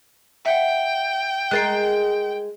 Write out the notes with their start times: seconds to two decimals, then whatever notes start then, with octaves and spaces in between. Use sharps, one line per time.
0.46 E5 F#5 G5
1.51 G#3 A#4 F#6 A6 C7